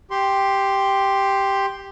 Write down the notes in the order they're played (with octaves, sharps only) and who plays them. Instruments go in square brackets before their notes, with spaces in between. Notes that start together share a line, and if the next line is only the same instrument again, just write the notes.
[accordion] G4 C6